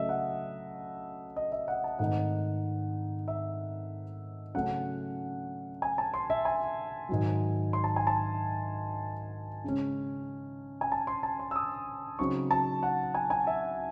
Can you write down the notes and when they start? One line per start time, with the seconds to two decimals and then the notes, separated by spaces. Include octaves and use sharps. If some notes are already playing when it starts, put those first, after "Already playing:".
Already playing: C#3 F#3 A3 D#5 E5
0.09 F#5
1.36 D#5
1.52 E5
1.68 F#5
1.84 A5
1.99 G#2 D#3 A3 C4 D#4 F#5
3.28 E5
4.54 C#3 F#3 A3 C#4 F#5
5.82 G#5
5.98 A5
6.14 C6
6.30 E5
6.45 G#5
7.09 G#2 D#3 F#3
7.73 C6
7.84 A5
7.96 G#5
8.07 A5
9.64 C#3 G#3 C#4
10.81 G#5
10.92 A5
11.07 C6
11.23 A5
11.39 C6
11.51 E6
11.56 D#6
12.19 C#3 F#3 C4 D#4 C#6
12.51 A5
12.83 F#5
13.14 G#5
13.30 G#5
13.47 E5